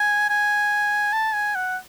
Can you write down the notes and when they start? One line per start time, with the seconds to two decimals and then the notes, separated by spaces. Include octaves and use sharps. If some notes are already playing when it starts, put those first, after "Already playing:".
Already playing: G#5
0.30 G#5
1.13 A5
1.34 G#5
1.55 F#5